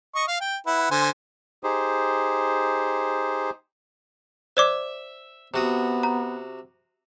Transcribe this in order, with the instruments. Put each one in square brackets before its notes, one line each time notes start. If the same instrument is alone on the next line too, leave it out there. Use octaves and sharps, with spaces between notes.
[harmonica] D#5 C#6
F5
G5
E4 B4 F#5
D3 C5 G#5
[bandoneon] D#4 G4 G#4 C5
[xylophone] C5 D5 D6 [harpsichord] E5
[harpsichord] C3 F#4 D#6 [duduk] B3
[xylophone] A#5